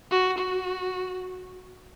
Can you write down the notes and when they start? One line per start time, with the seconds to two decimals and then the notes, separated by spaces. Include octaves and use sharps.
0.11 F#4
0.38 F#4